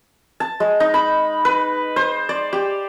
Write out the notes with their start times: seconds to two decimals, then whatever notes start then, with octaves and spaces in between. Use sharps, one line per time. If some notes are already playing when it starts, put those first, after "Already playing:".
0.40 A5
0.60 G#3
0.80 D#4
0.94 B5
1.45 B4
1.96 C5
2.29 D5
2.53 G4